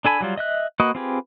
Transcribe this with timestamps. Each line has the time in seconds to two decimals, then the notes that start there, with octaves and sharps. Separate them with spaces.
0.05 D4 A4 G#5 B5
0.21 F#3 G3 F4
0.38 D#5 E5 F#6
0.80 A#3 F#4 B4 D#5 F#5
0.95 C4 F4 G4 G#4 B4